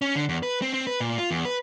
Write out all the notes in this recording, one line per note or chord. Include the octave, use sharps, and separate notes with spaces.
C#4
D3
E2
B4
C4
C4
B4
A#2
F4
E2
B4